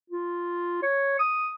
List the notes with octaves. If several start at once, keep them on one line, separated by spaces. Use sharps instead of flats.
F4
C#5
D#6